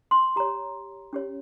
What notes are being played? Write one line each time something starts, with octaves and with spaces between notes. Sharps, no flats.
C6
G4 C#5 A#5
C#4 G4 C#5